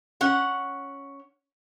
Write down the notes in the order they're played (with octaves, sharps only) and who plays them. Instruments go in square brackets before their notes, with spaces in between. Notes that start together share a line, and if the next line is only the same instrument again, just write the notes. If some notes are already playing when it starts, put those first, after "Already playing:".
[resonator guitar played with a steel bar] C#4 F#5